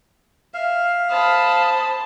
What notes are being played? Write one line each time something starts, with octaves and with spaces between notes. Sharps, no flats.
E5 F5
C5 A5 B5 D#6